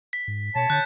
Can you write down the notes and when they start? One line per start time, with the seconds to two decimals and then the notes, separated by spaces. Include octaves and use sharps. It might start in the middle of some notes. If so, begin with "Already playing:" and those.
0.13 B6
0.28 G#2
0.55 B2 C#5 A5
0.70 D3 F#6 G6 B6